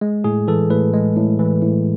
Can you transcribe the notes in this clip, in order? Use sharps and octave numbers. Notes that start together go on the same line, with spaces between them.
G#3
A2 G#4
E3 A4
A2 B4
G#3
A2
E3
A2